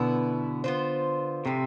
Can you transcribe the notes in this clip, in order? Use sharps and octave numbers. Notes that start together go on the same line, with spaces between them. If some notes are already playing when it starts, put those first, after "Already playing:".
Already playing: B2 D3 B3 E4
B3 F4 C5
A2 C3 F3 C4